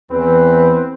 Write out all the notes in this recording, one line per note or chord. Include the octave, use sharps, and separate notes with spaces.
E2 E3 C4 B4